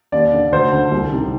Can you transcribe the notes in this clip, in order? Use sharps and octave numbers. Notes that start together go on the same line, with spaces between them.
D#2 D5
D3
D2 C5
D3
C2
C3 D#3